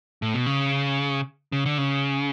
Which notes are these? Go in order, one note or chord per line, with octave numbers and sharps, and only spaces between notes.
A2
B2
C#3
C#3
D3
C#3